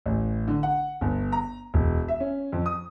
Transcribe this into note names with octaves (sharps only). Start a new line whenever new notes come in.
A1
D3
F#5
G1
A#5
E1
E5
C#4
F2
D#6